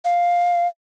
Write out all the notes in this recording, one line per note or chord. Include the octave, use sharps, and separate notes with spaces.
F5